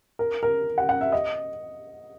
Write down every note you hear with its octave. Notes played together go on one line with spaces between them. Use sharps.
A#4
A#4
F#5
F#5
E5
D#5